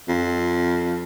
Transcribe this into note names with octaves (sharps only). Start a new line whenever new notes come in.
F2